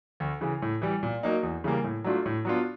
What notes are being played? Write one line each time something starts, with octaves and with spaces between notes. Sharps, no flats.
D2
C#3 E3
A2
E3 G3
A#2
F#3 A#3 D#4
E2
C#3 E3 G3 A#3
A2
F#3 A3 D4 F4
A2
F#3 B3 D4 F4